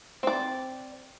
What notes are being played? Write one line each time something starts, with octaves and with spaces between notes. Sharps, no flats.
C4 D5